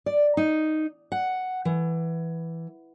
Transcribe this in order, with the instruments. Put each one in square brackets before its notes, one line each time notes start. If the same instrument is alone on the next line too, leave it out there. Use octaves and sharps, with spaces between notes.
[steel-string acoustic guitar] D5
D#4
F#5
E3